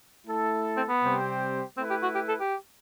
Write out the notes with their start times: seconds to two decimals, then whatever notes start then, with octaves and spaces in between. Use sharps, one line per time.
0.26 A3 E4 A4
0.77 C4
0.89 B3
1.02 C3 G3 C4 G4 C5
1.77 A3 C4 E4 B4
1.90 G4
2.03 F#4
2.15 G4
2.29 A4
2.40 G4